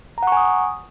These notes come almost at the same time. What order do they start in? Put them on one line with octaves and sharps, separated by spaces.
A#5 F#5 C#6 G#5 D#6